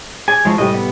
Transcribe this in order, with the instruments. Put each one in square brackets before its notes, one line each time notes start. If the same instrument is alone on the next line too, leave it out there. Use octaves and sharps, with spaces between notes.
[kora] G#4 D5 [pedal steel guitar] G#5
[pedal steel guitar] F3 G#3 [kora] C#4 E4
[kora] A2 C3 G3 [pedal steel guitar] D#5
[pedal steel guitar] B3